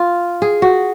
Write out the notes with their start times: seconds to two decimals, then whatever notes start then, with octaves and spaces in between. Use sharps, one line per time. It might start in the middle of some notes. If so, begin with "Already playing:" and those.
Already playing: F4
0.42 G#4
0.62 F#4